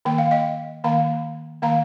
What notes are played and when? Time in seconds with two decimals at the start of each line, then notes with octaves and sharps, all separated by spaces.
0.05 D#3 A#3 G5
0.18 F5
0.31 D#5 G5
0.84 D#3 A#3 F5 A#5
1.62 D#3 A#3 F5 A#5